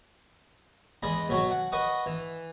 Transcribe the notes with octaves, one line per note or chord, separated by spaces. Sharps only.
E2 G#3 D#5 B5
B2 F#3 F#4
F#5
B4 D#5 F#5 C#6 D#6
E3